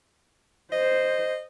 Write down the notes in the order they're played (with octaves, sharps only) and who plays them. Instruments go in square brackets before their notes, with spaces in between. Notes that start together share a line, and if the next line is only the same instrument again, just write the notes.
[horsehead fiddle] C5 [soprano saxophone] D#5